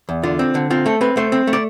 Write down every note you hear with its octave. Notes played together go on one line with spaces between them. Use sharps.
E2
D3 F4
C4
D3
C4 F4
A3 A4
C4 B4
A3 C5
C4
A3
D5